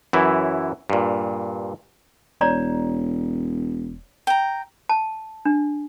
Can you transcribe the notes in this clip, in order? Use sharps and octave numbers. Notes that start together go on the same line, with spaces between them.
F#2 E3 E4
G2 A#2
E1 C#5 D5 A#5
G5 A#5
A5
D4